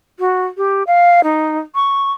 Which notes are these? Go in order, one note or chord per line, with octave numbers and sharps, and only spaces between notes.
F#4
G4
F5
D#4
C#6